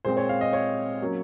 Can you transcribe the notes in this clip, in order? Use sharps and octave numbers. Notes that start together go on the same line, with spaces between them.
A#2 G#3 C4 C5
C#5
F5
D#5
C#5
F#3 A#3 C#4